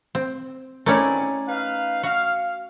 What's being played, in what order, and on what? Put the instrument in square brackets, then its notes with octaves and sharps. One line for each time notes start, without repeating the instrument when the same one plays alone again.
[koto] C4
[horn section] D#3 C4 [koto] A3 C#4 E4 [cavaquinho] A#4 D5 G#5
[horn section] D#4 B4 F5
[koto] F#4 [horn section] F5